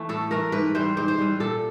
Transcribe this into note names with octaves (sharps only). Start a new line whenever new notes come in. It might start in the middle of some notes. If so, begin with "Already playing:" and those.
Already playing: E3 A3
A2 A4
E3 A3 A#4
G#2 B4
E3 G3 C5
G#2 C5
C5
E3 G3
A#2 A4